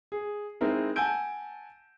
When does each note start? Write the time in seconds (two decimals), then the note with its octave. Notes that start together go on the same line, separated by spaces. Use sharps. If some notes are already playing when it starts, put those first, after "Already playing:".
0.12 G#4
0.61 G#3 C4 D#4 E4 A#4
0.96 F#5 G#5 A5 E6 G6 D7